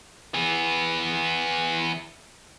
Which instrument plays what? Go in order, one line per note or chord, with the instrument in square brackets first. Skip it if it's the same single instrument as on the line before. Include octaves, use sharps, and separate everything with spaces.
[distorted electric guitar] E3 B3